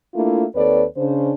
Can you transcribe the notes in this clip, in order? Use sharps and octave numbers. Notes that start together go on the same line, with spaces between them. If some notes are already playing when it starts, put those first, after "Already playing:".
A3 A#3 D4 E4 F4
D#2 C4 A4 B4 C#5 D5
C#3 D4 C5